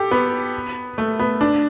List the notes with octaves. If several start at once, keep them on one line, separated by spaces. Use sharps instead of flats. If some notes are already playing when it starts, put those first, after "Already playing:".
Already playing: G4 A4
B3
A3
B3
D4